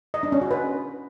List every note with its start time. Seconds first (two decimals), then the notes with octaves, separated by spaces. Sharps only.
0.14 D#5
0.23 D4
0.32 C#4
0.42 F#4
0.51 B4